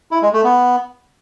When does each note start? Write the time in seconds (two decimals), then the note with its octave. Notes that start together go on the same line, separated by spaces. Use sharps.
0.11 E4
0.22 G#3
0.33 A3
0.44 B3